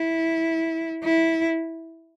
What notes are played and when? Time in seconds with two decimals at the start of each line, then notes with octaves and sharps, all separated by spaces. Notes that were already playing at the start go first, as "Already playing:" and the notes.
Already playing: E4
1.04 E4